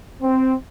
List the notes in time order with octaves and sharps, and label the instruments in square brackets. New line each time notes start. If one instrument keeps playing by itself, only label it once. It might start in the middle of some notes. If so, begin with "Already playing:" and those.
[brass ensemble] C4